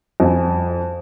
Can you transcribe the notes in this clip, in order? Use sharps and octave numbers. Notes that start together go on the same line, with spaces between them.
F2 G#5